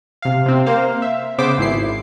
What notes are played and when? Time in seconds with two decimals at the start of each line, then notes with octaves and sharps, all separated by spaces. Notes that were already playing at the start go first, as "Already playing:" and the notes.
0.22 C3 F5
0.46 C3 C4
0.66 A#3 C5 F5
1.02 E5
1.38 C#3 B3 C5 D6 B6
1.58 G#1 E4 C7